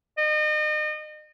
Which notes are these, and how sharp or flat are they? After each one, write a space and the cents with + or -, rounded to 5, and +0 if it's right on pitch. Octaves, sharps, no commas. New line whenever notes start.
D#5 -35